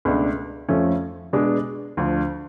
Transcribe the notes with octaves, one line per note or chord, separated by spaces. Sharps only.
C#2 B2 A3 D4
F2 F3 A3 C#4
B2 G#3 B3 D4
D2 D3 F3